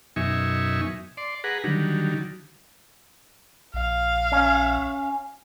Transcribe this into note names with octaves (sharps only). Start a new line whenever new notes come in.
F#2 B2 D#4 E5 G#5 C#6
D5 C6
G#4 B4 F#5 A#5
D3 D#3 F#3 G3
A#1 F5
C#4